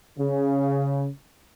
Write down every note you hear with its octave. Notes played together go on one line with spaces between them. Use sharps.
C#3